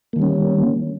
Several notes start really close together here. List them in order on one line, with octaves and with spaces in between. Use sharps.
A#3 D#3 G3 C#4